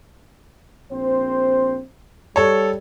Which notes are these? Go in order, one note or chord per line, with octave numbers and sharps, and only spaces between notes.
A#1 C4 C5
G3 A4 C#5